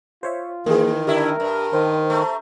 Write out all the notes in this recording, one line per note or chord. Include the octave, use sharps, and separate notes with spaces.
F4 C5 C#5 E5
D#3 E3 A#3 G#4
G2 D3 E4 G4 A#4 E5
G2
D#3 C5
A3 A#5